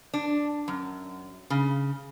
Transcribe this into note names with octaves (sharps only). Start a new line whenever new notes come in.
D4
F#2
C#3